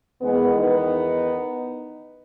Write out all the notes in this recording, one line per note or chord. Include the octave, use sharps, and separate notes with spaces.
E2 D#3 G#3 B3
B3 D#4